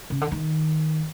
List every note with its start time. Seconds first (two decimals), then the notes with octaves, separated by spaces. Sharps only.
0.10 C#3
0.21 D3
0.32 D#3